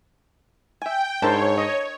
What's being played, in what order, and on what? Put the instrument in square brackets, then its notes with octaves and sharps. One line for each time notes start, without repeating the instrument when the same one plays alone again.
[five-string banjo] E5 G#5 [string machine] G5
[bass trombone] G#2 [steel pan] D4 A#4 C5 [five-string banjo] E4 A4 A5 [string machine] C#5
[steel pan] D#5